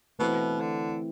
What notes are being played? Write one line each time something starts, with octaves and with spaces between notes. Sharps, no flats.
B2 E3 A3 C4 E4 B4
D3